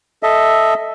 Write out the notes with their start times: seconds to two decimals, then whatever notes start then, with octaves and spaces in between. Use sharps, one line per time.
0.23 A4 D#5 E5